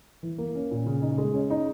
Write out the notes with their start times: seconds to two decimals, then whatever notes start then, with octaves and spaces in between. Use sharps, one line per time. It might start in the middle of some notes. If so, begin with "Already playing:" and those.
0.23 E3
0.38 A#3
0.55 C#4
0.71 A#2
0.86 C#3
1.02 D#4
1.18 G#3
1.34 C#4
1.50 D#4